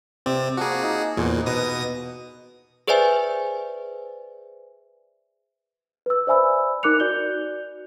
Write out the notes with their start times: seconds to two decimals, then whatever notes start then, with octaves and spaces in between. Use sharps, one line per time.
0.26 C3 C4 D5
0.57 F3 A#3 F#4 G#4
0.82 D#4
1.17 E2 A#2 G#4 C5 F#5
1.46 B2 B4 D#6 A#6
2.87 G#4 B4 C5 D5 E5 G#5
6.06 B4 E6
6.27 C5 D5 E5 G#5 B5 E6
6.83 D#4 A#4 D6 F#6 C#7 F7
7.00 F#4 D5 G6 G7